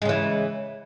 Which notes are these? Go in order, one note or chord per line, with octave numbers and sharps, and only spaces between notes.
C#3 E3 G#3